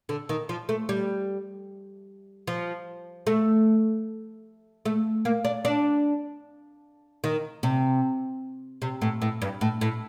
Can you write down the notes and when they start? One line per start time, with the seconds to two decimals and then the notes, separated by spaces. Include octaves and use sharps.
0.09 D3
0.29 D#3
0.49 F3
0.69 A3
0.89 G3
2.47 F3
3.27 A3
4.85 A3
5.25 A#3
5.45 D4
5.65 D4
7.24 D#3
7.63 C3
8.82 C3
9.02 A2
9.22 A2
9.42 G2
9.61 A2
9.81 A2